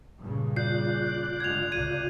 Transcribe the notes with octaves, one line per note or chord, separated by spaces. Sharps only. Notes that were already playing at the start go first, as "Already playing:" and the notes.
G2 A#2 C#3
F4 D5 F#6 G6 C7
G2 D3 G#3 G#6 F7
C#2 C3 G#6 D#7